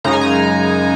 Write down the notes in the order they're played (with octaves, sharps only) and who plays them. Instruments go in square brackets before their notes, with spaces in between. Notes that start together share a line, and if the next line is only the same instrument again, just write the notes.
[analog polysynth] F#2 C#3 G#3 D#4 A#5
G#5
A#5